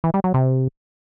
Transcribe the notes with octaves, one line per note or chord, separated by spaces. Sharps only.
E3
G3
F#3
C3